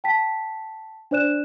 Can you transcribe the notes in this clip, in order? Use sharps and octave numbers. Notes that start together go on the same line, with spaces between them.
G5 A5 B6
D4 C5 D5 F#6 E7